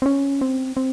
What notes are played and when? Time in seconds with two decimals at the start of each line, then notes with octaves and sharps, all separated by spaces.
0.02 C4
0.06 C#4
0.41 C4
0.77 C4